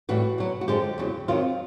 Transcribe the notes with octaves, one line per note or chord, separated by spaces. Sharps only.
A2 E3 G3 F#4
B2 F#3
F#4
F#2 D3 F3 G#3 G4
E2 C#3 F#3
F2 C3 D#3 F#3 F4